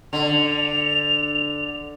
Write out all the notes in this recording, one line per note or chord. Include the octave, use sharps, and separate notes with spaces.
D3 F7